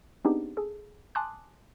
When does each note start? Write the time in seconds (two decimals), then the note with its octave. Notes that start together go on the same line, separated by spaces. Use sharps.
0.25 B3 C4 D4 D#4 G4 G#4
0.57 G#4 A4
1.15 G#5 A5 C6 D6 D#6 F#6